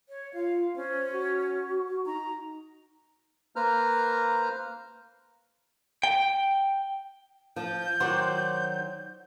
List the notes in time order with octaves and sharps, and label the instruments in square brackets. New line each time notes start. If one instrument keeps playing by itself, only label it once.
[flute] C#5
[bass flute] F4 [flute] F5
[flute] C#4 [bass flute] C5
[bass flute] F#4
[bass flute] D#4 [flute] A#5
[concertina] A#3 B4 C5 A#5 F6
[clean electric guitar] G5
[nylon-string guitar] F3 [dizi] G6
[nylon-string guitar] D#3 F#3 F#4 [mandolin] C5 D5